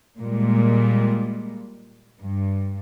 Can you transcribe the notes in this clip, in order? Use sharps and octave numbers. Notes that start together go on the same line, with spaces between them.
A#2 G3 G#3
G2